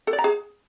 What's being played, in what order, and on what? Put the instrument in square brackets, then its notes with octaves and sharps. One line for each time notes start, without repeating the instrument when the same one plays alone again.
[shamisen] A4
D5
A#5
G#4